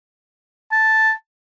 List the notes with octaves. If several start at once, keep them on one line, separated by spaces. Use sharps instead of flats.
A5